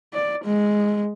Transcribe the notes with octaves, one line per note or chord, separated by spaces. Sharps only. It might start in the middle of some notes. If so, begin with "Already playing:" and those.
D5
G#3